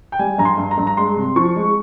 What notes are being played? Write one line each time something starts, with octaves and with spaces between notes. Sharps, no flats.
G5
G3 G#5
G2 A#5
C6
G2
A#5
G2
A#5
G#3 C6
C3
F3 C#6
G#3